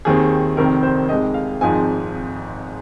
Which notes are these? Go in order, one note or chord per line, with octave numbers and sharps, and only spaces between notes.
D#2 D#3 C4 G#4
F1 F2 D#3 C4 A#4
C5
F2 C3 G#3 D#4 D#5
F5
G#1 G#2 F3 C4 D#4 G#5